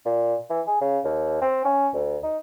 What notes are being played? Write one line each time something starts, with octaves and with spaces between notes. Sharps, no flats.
A#2
E3
G#4
C#3
D#2
C4
C#4
D2
D#4